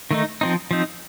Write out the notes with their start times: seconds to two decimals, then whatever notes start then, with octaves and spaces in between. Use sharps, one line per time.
0.11 D#3 A3 D#4
0.41 F3 C4 D#4
0.71 F3 C4 D#4